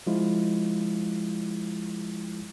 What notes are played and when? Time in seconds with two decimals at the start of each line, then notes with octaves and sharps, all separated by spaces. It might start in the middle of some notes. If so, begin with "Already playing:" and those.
0.07 F3 G#3 E4 F4